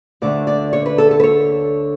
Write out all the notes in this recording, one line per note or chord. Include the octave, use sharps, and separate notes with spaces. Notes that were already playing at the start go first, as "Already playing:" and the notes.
D2 D3 A3 D5
D5
C#5
B4
A4
A4
B4
C#5